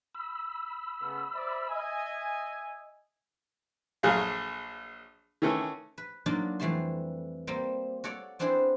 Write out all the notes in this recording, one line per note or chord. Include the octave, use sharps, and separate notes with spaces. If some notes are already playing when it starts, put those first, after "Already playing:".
B5 E6
C#3 A3 B3
C5 D5 E5
D#5 E5 G#5
A#1 F#3 A3 G#4 F5
D#3 E3 A3 C#4
B4
F#3 A#3 D4 D#4 F4
F2 E3 G3 A3 A5 C6
G3 A#3 C4
F#4 A4 C#5 D5
B3 C4 D4 E4 G#4 C5